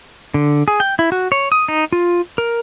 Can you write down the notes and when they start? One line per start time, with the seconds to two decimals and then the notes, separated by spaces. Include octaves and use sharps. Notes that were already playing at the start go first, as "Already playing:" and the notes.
0.34 D3
0.68 G#4
0.80 G5
0.99 E4
1.12 F#4
1.32 C#5
1.52 D#6
1.68 D#4
1.92 F4
2.38 A#4